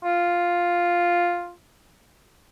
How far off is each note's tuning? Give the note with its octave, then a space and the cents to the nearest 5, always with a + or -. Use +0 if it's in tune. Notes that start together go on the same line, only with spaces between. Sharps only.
F4 +0